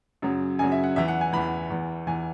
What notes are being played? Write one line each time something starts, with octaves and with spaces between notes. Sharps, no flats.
F#2 C#3 F#3
F#2 C#3 F#3 G#5
E5
F#5
E2 E3 E5
F#5
G#5
E2 E3 B5
E2 E3
E2 E3 G#5